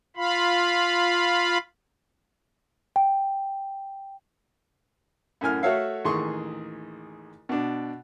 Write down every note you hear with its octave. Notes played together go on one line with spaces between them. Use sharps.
F4 F5 B5
G5
F#2 A2 G#5 F6
A3 F#4 A4 C#5 E5 F5
A1 D#2 G#4 C6 C#6
B2 D4